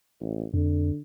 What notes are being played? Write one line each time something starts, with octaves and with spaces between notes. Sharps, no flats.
A1
F2 D3